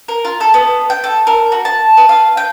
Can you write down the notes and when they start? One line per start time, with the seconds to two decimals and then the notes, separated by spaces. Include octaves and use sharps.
0.08 A#4
0.25 F4
0.41 A4
0.54 B3
0.90 G5
1.04 A4
1.27 A#4
1.52 F#4
1.65 A5
1.97 B4
2.09 F5
2.37 G5